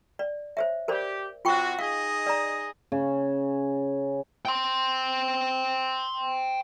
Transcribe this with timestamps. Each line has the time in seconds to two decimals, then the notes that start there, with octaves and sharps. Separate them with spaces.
0.19 D5
0.57 C5 C#5 E5
0.88 G4 A#4 C5 D5
1.45 C3 F4 F#4 G5 C#6
1.79 D#4 G#4 D#5 F5
2.27 D5 A#5
2.92 C#3
4.45 G5 C6